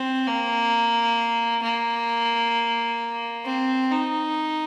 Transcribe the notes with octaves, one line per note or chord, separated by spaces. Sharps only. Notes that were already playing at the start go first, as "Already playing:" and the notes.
Already playing: C4
A#3
A#3
C4
D#4